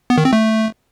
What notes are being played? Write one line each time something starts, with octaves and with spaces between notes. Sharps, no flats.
B3
D#3
C4
A3